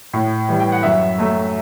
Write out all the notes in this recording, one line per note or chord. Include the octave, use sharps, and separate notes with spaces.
A2
E3 G3
G5
F#5
F#2 E5
F#3 A3